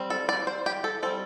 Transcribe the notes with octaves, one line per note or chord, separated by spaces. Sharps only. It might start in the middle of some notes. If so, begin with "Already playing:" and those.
Already playing: G3 C4
A4
D5
C5
G4
A4
G3 C4 A4